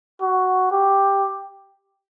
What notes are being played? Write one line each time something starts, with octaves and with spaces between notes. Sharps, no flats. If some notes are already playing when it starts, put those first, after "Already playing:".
F#4
G4